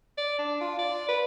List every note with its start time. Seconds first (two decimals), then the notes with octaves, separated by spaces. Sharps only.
0.18 D5
0.39 D4
0.61 F4
0.79 D5
1.08 B4